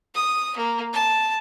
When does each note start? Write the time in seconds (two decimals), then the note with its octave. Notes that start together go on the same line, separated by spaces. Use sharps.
0.14 D#6
0.57 A#3
0.94 A5